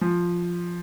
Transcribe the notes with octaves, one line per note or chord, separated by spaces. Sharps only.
F3